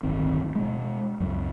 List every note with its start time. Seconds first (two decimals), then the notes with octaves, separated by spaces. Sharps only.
0.03 D1 G1 D#3 C4
0.55 B2 G#3
1.20 C#2 F#2